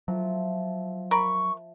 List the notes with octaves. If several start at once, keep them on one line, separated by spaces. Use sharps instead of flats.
F3 F#3 E5
A#4 B5 C#6